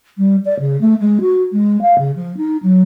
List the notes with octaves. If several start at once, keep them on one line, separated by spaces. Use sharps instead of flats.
G3
D5
C#3
A3
G#3
F#4
G#3
F5
C#3
F3
D#4
F#3